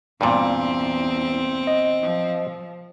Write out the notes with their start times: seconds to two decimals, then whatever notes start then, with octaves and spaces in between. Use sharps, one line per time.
0.21 E2 G2 A#2 C4
1.67 D#5
2.02 F3